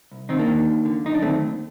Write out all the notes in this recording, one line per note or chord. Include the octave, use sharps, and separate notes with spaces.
C2
D#3 C4 D#4
A#3 D4
D#3
D#2
D3
F#2 D#4
D4
D#3 A3 C4
D#2